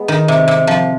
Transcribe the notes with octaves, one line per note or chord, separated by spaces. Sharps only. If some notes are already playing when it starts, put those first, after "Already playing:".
Already playing: G#3 B3
D#3
C3
C3
F3